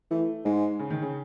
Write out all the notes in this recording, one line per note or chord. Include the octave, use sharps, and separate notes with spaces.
E3 A3
G#2 G#3
C#3
D#3
C#3